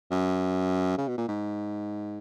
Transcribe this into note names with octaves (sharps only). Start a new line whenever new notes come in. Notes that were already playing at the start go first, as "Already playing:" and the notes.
F#2
C#3
B2
A#2
G#2